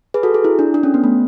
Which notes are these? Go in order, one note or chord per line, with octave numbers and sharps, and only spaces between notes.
G#4 B4
F#4 A4
G#4
E4
D4
D4
C#4
B3
A3